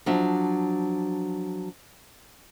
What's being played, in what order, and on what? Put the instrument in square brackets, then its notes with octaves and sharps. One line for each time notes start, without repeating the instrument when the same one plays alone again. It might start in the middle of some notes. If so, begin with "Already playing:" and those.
[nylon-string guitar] F3 F#3 D4 E5